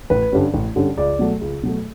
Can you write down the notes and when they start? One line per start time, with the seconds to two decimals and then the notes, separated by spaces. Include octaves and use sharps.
0.10 A1 B4
0.32 G2 D3 G3 C#4
0.54 A1
0.76 G2 D3 G3 C#4
0.97 C#2 D5
1.19 B2 F#3 A3
1.41 C#2
1.63 B2 F#3 A3